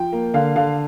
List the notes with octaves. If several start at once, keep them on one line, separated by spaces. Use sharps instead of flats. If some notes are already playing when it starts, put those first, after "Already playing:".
Already playing: F3 G5
A#3
D3 F5
D3 F5